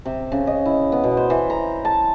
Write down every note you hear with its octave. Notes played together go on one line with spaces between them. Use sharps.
C3
C#3
D#5
E4
B3
B2
C5
E3
A#5
A5